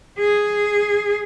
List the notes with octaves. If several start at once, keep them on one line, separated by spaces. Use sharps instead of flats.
G#4